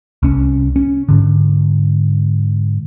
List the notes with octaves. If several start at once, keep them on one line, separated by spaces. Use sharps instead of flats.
C2 C#4
C#4
G#2 D3